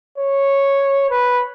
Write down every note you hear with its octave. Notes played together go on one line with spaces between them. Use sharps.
C#5
B4